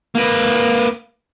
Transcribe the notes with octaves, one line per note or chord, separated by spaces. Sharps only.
A#3 B4